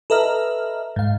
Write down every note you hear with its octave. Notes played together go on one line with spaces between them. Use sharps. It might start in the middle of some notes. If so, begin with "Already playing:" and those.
A4 B4 D#5 E5 A#5 F6
G#2 F5